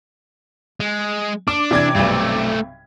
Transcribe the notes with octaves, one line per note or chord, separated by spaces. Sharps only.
G#3
D4 D6
C3 E3 D5 G#6
B1 G2 A3 C4